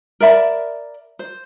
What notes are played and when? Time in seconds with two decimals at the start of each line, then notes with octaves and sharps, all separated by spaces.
0.20 A#4 D5 E5 B5
1.19 C5